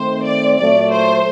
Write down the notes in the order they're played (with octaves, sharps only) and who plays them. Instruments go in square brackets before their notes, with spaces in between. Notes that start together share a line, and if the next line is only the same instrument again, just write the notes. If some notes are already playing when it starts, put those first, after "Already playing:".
Already playing: [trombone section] D#3 A3 C4 [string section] C5
[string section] D5
[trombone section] A#2 F#3 A3 [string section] D5
[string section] C5